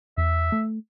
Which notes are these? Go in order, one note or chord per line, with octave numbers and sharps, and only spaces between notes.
E2 E5
A3